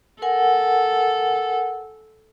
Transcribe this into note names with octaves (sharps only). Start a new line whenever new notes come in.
A4 A#4 F#5 G#5